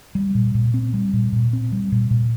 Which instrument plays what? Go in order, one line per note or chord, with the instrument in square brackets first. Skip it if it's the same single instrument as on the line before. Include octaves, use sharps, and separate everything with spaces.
[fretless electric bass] G3
A#2
A#2
C4
G3
A#2
A#2
C4
G3
A#2
A#2